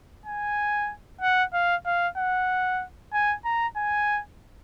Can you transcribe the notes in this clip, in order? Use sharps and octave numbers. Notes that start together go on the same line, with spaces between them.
G#5
F#5
F5
F5
F#5
G#5
A#5
G#5